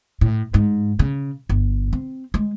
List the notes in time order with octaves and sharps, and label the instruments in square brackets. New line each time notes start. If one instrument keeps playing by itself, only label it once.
[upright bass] A2
G#2
C#3
G1
C4
G#3